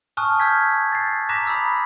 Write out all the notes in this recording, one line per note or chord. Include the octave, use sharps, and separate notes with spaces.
G#5 A5 C#6 D#6 F6 F#6
E6 F6 G6 G#6 B6
A6 C7
A#5 D6 F#6 A#6 B6 E7
A#5 B5 D#6 E6